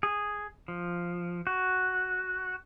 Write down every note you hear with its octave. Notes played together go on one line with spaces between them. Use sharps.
G#4
F3
F#4